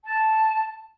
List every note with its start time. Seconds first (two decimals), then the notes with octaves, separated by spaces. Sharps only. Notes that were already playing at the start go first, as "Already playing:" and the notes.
0.04 A5